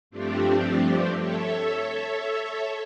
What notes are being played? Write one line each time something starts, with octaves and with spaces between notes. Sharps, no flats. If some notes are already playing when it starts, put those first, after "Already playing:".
G2 F3 A3 C4 D4 G4
A4 C#5 E5